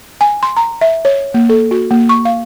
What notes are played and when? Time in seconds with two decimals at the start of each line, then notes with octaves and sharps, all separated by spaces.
0.21 G#5
0.43 C6
0.57 A#5
0.81 E5
1.05 C#5
1.34 A#3
1.49 A4
1.71 F#4
1.91 A#3
2.09 C#6
2.25 F5